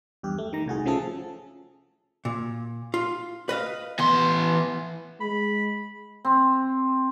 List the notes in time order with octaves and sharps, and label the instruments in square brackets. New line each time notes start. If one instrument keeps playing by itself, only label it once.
[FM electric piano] E2 G2 G4
A3
D#3 A#5
C2 A2 F#4 G#4
C#3 F3 A3 C#4 G#4 A4
[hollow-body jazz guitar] A#2
F4
B4 D#5 F5
[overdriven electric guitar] E3 C6 [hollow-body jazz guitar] B3
[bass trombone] G#3 [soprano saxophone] B5
[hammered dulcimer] C4